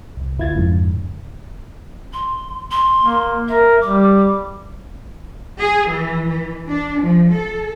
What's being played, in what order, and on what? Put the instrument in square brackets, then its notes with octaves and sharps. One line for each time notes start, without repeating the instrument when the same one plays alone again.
[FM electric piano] C2
G1 D2 E4 F4 G#6 A6
F2 G#2 C#3
[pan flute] C6
C6
[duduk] A#3
[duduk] A#4 [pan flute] E5
[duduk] G3 [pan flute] D6
[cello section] G#4
E3
E3
D4
F3
A4